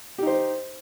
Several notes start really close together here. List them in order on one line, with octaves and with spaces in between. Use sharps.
G4 D#4 C5